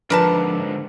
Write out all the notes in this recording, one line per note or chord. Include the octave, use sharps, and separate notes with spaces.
G#2 D3 F3 D4 A#4 B4 A5 D6